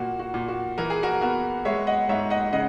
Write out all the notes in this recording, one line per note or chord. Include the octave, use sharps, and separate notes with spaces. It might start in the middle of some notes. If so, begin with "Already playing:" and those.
Already playing: A#2 A#3 F#4
F#4
A#2
F#4
E3 A#4
G#4
F#4 A#4
B3 F#4 A#4
G#3 C#5 E5
D#5 F#5
G#2 C#5 E5
D#5 F#5
C#3 D#5 F#5